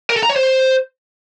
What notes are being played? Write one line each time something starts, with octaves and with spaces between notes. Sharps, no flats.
A#4
A4
A#5
C#5
C5